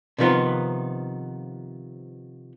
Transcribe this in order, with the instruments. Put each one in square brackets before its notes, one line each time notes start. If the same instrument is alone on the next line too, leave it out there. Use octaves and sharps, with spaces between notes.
[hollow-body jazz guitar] C3 D#3 F3 B3 D#4 F4